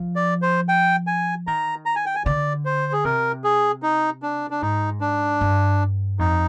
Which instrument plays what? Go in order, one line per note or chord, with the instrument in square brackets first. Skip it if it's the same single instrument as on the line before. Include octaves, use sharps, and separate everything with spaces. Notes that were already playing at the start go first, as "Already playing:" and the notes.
Already playing: [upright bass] F3
[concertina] D5
C5
G5
G#5
[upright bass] D#3 [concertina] A#5
[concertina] A#5
G#5
G5
G#5
[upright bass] D3 [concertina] D5
[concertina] C5
G#4
[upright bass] C3 [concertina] A#4
[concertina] G#4
D#4
D4
D4
[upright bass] G#2 [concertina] D#4
[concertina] D4
[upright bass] G2
[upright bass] F2 [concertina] D#4